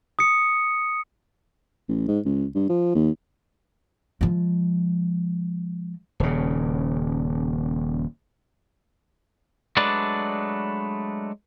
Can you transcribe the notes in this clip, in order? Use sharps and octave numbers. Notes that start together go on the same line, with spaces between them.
D#6 C#7
A1
G#2
C#2
G2
F3
D#2
F3 G#3
D#1 C#3
F#3 G#3 A3 D4 B4 D5